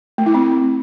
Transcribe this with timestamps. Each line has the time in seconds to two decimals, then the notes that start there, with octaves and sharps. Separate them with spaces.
0.18 A3
0.26 E4
0.34 C4